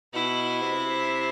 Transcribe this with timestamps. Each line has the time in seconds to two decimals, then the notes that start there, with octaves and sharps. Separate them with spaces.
0.14 B2 E4
0.62 C3